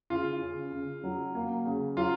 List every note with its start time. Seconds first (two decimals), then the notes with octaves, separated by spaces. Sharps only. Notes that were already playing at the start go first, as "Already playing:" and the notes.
0.10 C#3 F4
0.41 C#3
0.72 C#3
1.04 F#3
1.35 A#3
1.65 C#3
1.97 F#3 F4